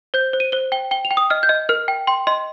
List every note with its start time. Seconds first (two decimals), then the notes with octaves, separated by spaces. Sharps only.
0.14 C5 G6
0.33 C5
0.40 D#7
0.52 C5 G7
0.72 G5 G7
0.91 G5 G7
1.05 F7
1.11 G5
1.17 D#6
1.30 D#5 F6
1.43 G6
1.49 D#5
1.69 A#4 F6
1.88 G5
2.07 G5 C6
2.27 D#5 C6